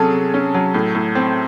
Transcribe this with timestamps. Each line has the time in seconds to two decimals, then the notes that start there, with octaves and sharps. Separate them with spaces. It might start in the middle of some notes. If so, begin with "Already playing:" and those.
Already playing: C3 F#3 C#4 G#4 A4
0.14 C3
0.34 C#4
0.54 F#3
0.74 A2
0.95 A2
1.15 C4